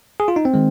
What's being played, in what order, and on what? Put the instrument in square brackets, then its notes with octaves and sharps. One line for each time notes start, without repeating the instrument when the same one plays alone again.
[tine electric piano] G#4
F4
D#4
C4
D#3 G#3